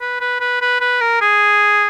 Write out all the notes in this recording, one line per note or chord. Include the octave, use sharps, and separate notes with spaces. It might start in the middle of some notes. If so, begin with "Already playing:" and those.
B4
B4
B4
B4
B4
A#4
G#4